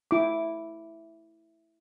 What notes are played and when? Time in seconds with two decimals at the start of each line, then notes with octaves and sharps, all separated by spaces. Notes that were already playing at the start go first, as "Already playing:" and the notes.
0.11 E4 D6